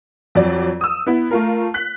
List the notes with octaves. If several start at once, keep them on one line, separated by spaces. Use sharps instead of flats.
F2 F#3 D5
D#6 E6
B3 E4
A3 F4 A#4
F#6 B6